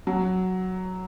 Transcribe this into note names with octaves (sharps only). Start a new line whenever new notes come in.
F#3